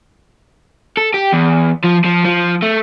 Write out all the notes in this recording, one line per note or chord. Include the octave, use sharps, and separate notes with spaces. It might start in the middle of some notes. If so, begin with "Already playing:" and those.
A4
G4
E2
F3
F3
F3
A3